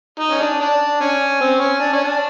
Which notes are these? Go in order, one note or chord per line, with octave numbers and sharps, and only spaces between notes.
D#4
C#4
D4
D4
C#4
C4
C#4
D4
C#4
D4